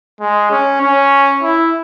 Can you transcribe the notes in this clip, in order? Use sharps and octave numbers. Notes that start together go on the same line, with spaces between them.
G#3
C#4
C#4
E4